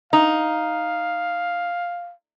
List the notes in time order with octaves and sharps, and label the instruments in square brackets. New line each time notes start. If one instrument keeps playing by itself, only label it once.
[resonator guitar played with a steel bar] D#4 [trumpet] F5